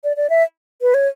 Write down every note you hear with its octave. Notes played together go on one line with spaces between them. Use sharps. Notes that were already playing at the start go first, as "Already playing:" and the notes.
D5
D5
E5
B4
C#5